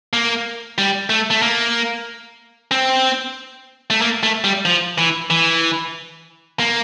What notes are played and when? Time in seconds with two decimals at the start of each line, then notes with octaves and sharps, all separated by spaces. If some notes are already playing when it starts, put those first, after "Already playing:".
0.13 A#3
0.78 G3
1.10 A3
1.30 A3
1.42 A#3
2.71 C4
3.90 A3
4.01 A#3
4.23 A3
4.44 G3
4.65 F3
4.98 E3
5.30 E3
6.60 A#3